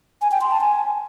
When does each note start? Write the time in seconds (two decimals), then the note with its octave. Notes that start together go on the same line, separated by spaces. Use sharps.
0.22 G#5
0.31 G5
0.41 C6
0.51 A5
0.61 G#5